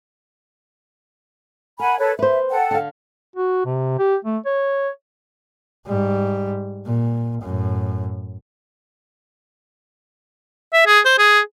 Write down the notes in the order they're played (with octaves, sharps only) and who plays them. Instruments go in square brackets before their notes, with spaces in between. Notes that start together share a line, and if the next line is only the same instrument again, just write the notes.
[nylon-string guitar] A#4 [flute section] F#5 G#5 B5
[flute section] A4 B4 C#5
[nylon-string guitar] B4 C5 [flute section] E5
[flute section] A4 F#5 G5
[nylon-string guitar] D3 F5
[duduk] F#4
C3
G4
A3
C#5
[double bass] G#2 G3
A#2
F#2 A2
[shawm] E5
G#4
C5
G#4